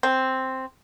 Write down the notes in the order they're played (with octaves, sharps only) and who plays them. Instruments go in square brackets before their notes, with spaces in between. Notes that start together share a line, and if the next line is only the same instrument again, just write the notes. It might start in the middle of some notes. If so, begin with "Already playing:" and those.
[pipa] C4